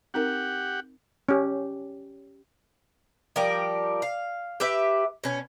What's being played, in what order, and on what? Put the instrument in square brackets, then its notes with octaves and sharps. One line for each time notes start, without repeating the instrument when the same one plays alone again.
[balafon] C4 D#4 A#4 [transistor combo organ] G4 F#5
[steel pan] C#4 G4
[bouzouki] F3 G3 G4 A#4
F5
G4 B4 E5
B2 C#4